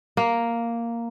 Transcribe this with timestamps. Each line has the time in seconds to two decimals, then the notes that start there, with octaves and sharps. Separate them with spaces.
0.17 A#3